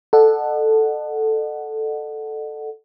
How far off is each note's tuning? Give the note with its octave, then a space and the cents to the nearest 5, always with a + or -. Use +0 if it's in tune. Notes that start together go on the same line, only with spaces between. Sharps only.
A4 +0 D#5 -45 F#5 +0